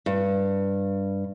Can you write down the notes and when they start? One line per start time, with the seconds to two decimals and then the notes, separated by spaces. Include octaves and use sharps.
0.06 G2